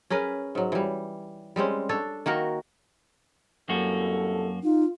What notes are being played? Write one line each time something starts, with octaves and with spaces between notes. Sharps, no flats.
C#4 G#4 A#4 B4
G#2 F#3
E3 G3
G3 G#3 C4 C#4
D4 A4 C#5
D#3 A#3 F#4 A#4
C2 F#2 A#3 F#4 A4
D#4 F4